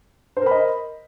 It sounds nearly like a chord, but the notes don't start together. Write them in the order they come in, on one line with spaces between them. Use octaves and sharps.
C5 A#4 B5 D#5